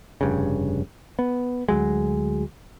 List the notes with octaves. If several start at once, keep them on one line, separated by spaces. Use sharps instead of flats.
F1 G2 C#3
B3
D2 F#3 G#3